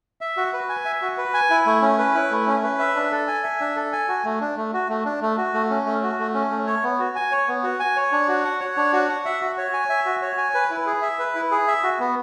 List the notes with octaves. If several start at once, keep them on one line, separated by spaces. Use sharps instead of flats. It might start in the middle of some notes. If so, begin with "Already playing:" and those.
E5
F#4
B4
G#5
E5
F#4
B4
G#5
E4
A3
C#4
B4
E4
A3
C#4
B4
E5
D4
A4
G#5
E5
D4
A4
G#5
F#4
A3
D4
A3
F#4
A3
D4
A3
F#4
A3
C#4
A3
F#4
A3
C#4
A3
C#5
B3
F#4
G#5
C#5
B3
F#4
G#5
C#5
D4
F#4
F#5
C#5
D4
F#4
F#5
E5
F#4
C#5
G#5
E5
F#4
C#5
G#5
B4
E4
G#4
E5
B4
E4
G#4
E5
F#4
B3